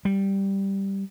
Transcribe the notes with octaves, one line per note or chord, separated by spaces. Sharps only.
G3